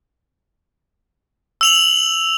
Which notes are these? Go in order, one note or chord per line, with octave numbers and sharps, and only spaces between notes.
E6 F7 F#7